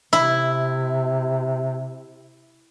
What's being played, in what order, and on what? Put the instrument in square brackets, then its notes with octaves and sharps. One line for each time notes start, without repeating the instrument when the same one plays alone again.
[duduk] C3 [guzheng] E4